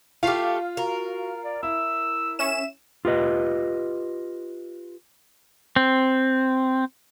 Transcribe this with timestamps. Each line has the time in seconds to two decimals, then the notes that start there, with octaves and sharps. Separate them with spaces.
0.23 A3 F4 G4 F5
0.77 F#4 A#4
1.44 D5
1.63 E4 E6
2.39 C#4 E5 E7
3.05 F4 G4 B4 D#5
5.76 C4